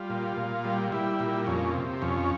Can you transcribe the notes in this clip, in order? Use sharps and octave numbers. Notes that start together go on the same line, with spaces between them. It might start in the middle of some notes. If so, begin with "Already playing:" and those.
Already playing: G3 F4
A#2
A#2
G3
G3 E4
A#2
F2 C#4
C3
F2 C#4